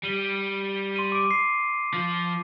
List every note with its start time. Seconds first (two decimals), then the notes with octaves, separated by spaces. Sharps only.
0.04 G3 D#7 G7
0.96 C6 D#7
1.12 D6 D7
1.31 C7
1.94 F3